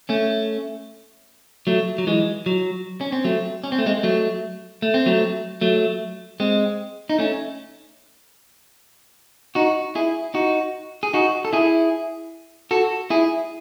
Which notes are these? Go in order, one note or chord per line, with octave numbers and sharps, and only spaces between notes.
A3 C#4
F#3 A3
F#3
E3 G#3
F#3
C#4
C4
F#3 A3
C#4
C4
A3
G#3 C4
F#3 A3
A3
C4
F#3 A3
F#3 A3
G#3 C4
D#4
A3 C#4
D#4 F#4
E4 G#4
D#4 F#4
G#4
D#4 F#4
A4
E4 G#4
F#4 A4
E4 G#4